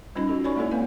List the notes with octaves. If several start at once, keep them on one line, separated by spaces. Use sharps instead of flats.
G3 C#4 D#4 F4 D#5 B5
C#4 F#4 A4
D#4 C#5 D5 G#5 B5 C#6
G#3 A#3 E4 A4 C#5
A#3 C4 B4 F5 G#5